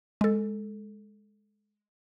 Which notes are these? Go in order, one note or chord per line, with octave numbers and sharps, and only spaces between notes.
G#3 A4